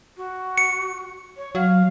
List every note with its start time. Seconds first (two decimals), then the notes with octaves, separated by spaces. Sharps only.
0.17 F#4
0.58 C#7
1.37 C#5
1.55 F#3 F5